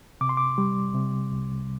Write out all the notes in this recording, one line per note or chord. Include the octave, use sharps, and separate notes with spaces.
C3 D6
C6
D6
G3
C3
C2